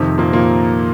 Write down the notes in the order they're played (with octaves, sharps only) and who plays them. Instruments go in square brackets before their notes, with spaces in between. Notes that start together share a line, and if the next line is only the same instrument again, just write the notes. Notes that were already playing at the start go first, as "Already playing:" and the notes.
Already playing: [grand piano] F2 C3 D#3
[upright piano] A#2 A#3
A#2 A#3